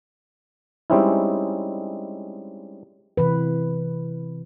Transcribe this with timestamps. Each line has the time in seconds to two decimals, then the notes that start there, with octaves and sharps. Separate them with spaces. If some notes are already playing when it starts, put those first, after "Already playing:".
0.90 G3 G#3 C4 C#4 D#4 E4
3.17 C3 E3 B4